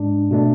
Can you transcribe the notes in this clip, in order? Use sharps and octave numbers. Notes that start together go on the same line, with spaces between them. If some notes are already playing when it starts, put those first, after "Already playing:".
Already playing: G#2 G#3 D4
B2 A3 D4